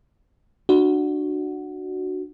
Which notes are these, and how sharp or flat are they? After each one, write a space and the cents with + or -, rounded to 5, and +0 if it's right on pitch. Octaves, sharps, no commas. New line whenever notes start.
D4 +25 F#4 +0